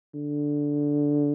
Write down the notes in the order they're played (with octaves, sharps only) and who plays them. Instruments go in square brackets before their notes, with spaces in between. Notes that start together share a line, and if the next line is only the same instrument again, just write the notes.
[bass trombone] D3